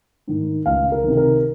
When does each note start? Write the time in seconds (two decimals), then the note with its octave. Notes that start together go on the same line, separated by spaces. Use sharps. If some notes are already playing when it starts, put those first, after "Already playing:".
0.27 G#2 D#3
0.66 C#2 F5
0.92 A#4
1.04 C3 D#3
1.17 A#4